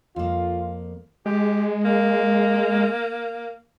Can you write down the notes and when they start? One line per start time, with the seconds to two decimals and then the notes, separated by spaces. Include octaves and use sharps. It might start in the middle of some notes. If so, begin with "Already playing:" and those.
0.16 F2 A#3 F4
1.26 G#3 G4
1.85 A#3